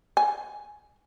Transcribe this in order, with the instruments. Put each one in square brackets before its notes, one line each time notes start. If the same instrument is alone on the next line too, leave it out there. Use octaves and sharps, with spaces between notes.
[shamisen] G#5